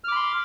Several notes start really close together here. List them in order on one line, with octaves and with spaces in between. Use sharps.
F6 D6 B5 C6